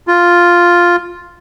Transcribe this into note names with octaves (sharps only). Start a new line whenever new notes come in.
F4